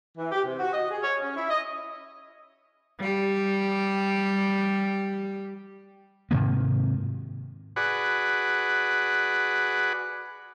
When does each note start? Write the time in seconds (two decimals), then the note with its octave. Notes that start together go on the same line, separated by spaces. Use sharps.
0.18 E3
0.32 G4
0.45 C3
0.60 F#4
0.73 D#5
0.91 G#4
1.03 C#5
1.21 C#4
1.36 E4
1.50 D#5
3.00 G3 G4
6.31 G#2 C3 D#3 A#3
7.76 F#4 G#4 B4 D5 F#5